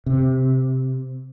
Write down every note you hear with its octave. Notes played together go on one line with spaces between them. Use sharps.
C3